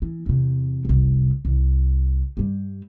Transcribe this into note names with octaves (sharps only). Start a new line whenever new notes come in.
E3
E2 C3
F1 C2
C2
G2 G3